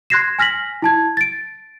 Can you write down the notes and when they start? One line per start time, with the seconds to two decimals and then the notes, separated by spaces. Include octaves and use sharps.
0.10 C6 F#6 G#6 A#6 C7 E7
0.39 G#5 F6 A#6 B6 F#7
0.82 E4 A5 G#6
1.17 A6 D7